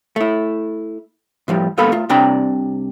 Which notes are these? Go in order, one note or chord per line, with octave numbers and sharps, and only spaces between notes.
A3 E4
A2 F3 G3
G2 A#3 B3 A4 F5 B5
A3 F4
C2 C3 D4 D5 G5 A#5